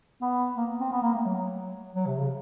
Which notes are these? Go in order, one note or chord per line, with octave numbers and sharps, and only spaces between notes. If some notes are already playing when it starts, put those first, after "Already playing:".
B3
A#3
C4
B3
A#3
A3
F#3
F#3
C3
C#3